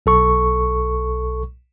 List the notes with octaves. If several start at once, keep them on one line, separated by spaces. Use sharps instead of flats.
B1 A4 C#6